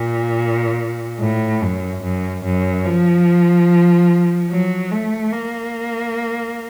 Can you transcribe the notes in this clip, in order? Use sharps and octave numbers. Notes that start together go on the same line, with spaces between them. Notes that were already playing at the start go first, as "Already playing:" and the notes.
Already playing: A#2
A2
F#2
F#2
F#2
F3
F#3
A3
A#3